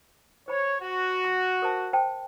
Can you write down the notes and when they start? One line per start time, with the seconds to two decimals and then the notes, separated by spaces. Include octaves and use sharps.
0.48 C5 C#5 B5
0.81 F#4
1.24 C6
1.62 A#4 C5 A5
1.93 C5 G5 A5